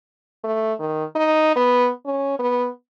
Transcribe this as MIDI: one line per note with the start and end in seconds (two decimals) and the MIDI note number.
0.44 0.73 57
0.79 1.04 51
1.16 1.52 63
1.56 1.90 59
2.06 2.36 61
2.39 2.69 59